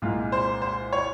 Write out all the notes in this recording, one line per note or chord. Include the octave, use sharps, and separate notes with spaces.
C2 A#2 G#3 F4
C5
C5
C#5